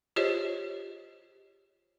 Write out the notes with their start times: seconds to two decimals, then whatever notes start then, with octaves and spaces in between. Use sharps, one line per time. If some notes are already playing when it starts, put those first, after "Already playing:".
0.16 F4 G4 G#4 C5 C#5 D#5